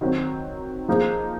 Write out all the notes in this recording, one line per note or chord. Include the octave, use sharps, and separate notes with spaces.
D#3 F#3 C4
F3 A#3 D#4 G#4 C5